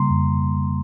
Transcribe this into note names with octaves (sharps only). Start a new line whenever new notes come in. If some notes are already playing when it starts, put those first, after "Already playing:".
Already playing: C#3 G3 A#3 A#5 C6
F2